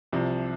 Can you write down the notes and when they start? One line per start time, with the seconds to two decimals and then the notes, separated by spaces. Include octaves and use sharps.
0.12 C2 C3 F3